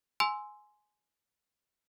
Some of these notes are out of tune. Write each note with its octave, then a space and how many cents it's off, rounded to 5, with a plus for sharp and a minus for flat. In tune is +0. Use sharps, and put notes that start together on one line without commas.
G#5 +10 C6 +0 E6 +0